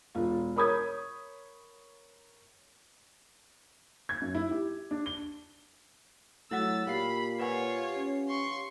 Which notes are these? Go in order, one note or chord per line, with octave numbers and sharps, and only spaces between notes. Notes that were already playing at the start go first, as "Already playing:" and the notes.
E1 F4
A#4 C#5 B5 D#6 G6 G#6
G#6
F#2
E4
G4
D4
G7
F#3 A3 E4 F#4 F#5 E6 A6
A#2 G4 F5 G5 B5 C7
F4 B4 C#5 F#5 G#5
C#4
C6 C#6